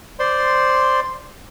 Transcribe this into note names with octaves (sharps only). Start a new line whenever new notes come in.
C5 D5 C6